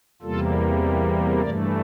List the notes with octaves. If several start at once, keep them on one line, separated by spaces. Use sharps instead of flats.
E2 C3 G3 A#3 F4 A4
G2 E3 A3 A#4 D5